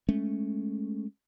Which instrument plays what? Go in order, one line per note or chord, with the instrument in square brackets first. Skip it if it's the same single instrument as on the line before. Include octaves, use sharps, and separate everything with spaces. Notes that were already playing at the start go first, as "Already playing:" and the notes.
[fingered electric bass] G#3 A3 C#4